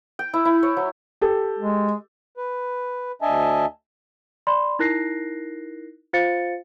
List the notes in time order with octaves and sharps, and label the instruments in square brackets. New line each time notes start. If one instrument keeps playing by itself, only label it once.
[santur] G5
E4
E4
C#5
F#3
[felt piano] G4 A4
[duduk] G#3
[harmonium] B4
D2 D4 D#5 E5 G#5 A5
[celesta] D5 B5 C6
D#4 E4 A#4 F#6 A#6 C7
F4 C5 F5 A6 C#7